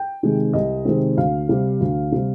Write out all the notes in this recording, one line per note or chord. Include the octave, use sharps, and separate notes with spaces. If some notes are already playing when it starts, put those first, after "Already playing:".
Already playing: G5
C3 D#3 G#3 C4
C2 D#5
C3 D#3 G#3 C4
D2 F5
C3 G3
D2
C3 G3